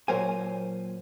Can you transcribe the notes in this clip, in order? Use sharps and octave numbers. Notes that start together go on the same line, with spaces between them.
A#2 F#3 A#4 C5 G#5